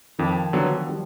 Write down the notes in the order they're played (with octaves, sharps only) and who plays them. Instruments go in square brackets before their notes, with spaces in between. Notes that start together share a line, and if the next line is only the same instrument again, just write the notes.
[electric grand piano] F2 [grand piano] D#3 F3
[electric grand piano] D3 F#3 B3
[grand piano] F3 G3